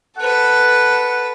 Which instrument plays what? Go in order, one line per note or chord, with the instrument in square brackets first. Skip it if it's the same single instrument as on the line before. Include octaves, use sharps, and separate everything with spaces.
[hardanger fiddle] A4 B4 [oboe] F#5